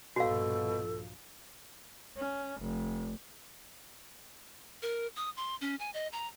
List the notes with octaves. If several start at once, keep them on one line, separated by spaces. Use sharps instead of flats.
A#1 G2 B2 F3 F#4 A4 F5
C#4
F1
A#4
D#6
C6
C#4
G#5
D#5
A#5